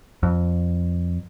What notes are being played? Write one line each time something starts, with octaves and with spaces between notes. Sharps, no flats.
F2